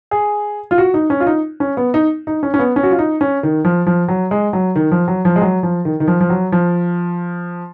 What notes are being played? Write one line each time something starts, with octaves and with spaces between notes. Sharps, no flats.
G#4
F4
F#4
D#4
C#4
F4
D#4
C#4
B3
D#4
D#4
C#4
C#4
B3
C#4
F#4
F4
D#4
C#4
D#3
F3
F3
F#3
G#3
F#3
D#3
F3
F#3
F3
G#3
F#3
F3
D#3
D#3
F3
F3
F#3
F3